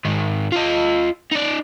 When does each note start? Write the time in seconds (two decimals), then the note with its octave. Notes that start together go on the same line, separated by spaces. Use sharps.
0.05 G#2 D#3
0.52 F4 D#5
1.31 D#4 D5